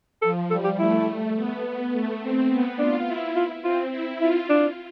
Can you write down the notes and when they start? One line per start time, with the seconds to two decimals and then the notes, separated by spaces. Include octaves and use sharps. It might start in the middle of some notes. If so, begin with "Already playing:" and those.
0.22 F3 A4
0.50 G3 A4
0.64 G4
0.79 A3 E4
1.36 B3
1.64 B3
1.93 A3
2.21 C4
2.50 B3
2.78 D4 F4
3.07 E4
3.36 F4
3.64 C4 F4
3.92 E4
4.20 E4 F4
4.49 D4